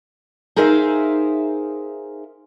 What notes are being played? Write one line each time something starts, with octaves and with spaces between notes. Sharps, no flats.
D#4 G#4 A#4 C5 E5 F5